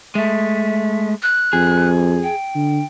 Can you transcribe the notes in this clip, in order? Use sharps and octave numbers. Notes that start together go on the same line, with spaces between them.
G#3 A3 E5
F#6
F2 G#4
G5
D3